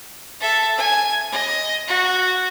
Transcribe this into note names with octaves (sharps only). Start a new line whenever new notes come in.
A4 E5
G#5
D#5
F#4